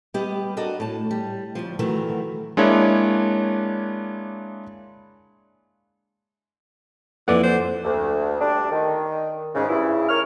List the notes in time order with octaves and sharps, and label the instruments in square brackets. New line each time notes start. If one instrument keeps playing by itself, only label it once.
[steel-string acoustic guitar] G3 B3 G4 B4 D#5
D4 F#4 A4 A#4 D5 D#5
A2 A5
G3
D2 G#2 F3
D#3 E3 F#3 A3 F#4 A#4
[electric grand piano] G#3 A#3 D4 E4 C#5
[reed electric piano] F2 D5 F#5 [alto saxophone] E3 [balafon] A#3 A4 B4
[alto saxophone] C5
[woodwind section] D2
D2 G3 D4
D#3
G#2 C#3
G2 C#3 E4
A#4 C#5 F6